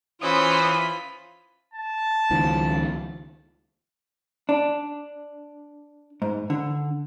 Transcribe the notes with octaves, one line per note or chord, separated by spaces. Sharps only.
E3 C#4 F4 C5 B5 D#6
A5
C#2 D#3 F3
D4
G#2
D3